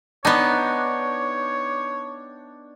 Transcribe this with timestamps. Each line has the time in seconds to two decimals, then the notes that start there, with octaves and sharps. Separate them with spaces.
0.25 B3 D4 D#4 C#5 G5